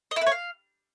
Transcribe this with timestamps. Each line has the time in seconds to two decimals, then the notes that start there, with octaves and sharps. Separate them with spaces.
0.11 D#5
0.16 E4
0.21 B4
0.26 C#5
0.32 F5